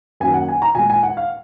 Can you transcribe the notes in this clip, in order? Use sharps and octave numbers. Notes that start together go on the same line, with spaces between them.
F#2 D#3 F#3 A#3 G#5
F#5
G#5
A#5
A#2 G#3 G#5
G#5
F#5
F5